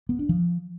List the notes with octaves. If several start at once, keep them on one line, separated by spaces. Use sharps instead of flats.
B3
D4
F3